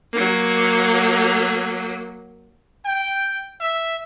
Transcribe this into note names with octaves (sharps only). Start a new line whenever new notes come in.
F#3 A#3
G5
E5